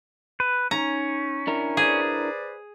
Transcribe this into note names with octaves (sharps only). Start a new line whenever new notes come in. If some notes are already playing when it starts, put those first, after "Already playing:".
B4
C#4 D#4 A#5
D4 E4 A#4
G#4 B4 C5 D5